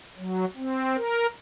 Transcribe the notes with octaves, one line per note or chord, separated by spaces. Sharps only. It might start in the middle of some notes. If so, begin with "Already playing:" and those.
F#3
C4
A#4